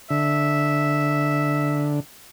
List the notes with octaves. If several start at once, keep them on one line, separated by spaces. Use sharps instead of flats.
D3 E5